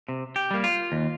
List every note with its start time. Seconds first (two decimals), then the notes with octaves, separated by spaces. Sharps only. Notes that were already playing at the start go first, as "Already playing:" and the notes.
0.09 C3
0.36 G4
0.51 G3 A#3
0.64 F4
0.92 D#2